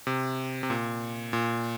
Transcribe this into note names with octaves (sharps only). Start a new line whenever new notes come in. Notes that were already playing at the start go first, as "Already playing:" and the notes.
C3
C3
A#2
A#2